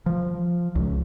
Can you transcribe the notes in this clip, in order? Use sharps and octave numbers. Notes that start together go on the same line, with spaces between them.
F3
C#2